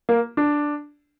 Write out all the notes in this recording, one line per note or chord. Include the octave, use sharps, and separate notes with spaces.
A#3
D4